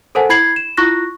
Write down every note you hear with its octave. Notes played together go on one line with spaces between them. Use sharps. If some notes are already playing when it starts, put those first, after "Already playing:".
A4 A#4 C5 F#5 G#5 A5
E4 B5 G#6 C7 F#7
E7
E4 F4 C#6 F#6 A#6